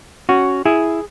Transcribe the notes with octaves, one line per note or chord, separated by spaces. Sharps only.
C#4 F#4
E4 G#4